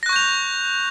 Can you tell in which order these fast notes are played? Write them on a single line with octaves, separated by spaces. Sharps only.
A#6 F#6 C#6 G6 F7